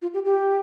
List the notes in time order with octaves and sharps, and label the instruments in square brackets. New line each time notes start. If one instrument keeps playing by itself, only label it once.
[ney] F4
G4
G4